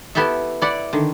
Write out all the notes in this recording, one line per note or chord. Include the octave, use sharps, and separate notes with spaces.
B3 E4 G4 A4 E5
E4 D5 F#5
D3 D#3